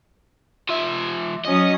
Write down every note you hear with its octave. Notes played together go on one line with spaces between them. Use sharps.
F3 E5
F#3 C#4 D#5 D#6